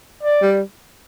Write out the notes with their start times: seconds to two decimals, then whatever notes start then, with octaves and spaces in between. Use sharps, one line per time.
0.23 D5
0.42 G3